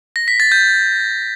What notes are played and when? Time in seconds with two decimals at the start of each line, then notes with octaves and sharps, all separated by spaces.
0.16 A#6
0.28 B6
0.40 A6
0.52 G6